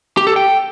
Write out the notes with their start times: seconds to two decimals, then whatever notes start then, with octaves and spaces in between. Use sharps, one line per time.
0.17 G4
0.27 A4
0.36 G5